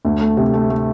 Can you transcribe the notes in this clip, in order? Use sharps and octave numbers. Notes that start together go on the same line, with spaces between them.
D2
A3
C3
A3
A3